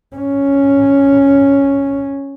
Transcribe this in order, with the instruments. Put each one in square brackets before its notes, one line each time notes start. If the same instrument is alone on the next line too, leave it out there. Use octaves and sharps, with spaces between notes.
[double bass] C#4